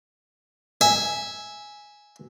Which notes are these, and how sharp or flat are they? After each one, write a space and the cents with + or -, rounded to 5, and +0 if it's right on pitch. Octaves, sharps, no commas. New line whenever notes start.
E5 -10 G#5 +0